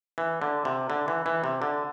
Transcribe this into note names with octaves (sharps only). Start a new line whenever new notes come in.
E3
D3
C3
D3
E3
E3
C3
D3